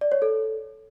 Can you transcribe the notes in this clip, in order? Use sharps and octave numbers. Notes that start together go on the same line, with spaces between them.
D5
C#5
A4